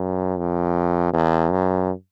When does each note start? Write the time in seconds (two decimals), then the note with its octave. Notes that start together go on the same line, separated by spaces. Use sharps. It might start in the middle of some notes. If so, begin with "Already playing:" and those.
Already playing: F#2
0.38 F2
1.14 E2
1.51 F#2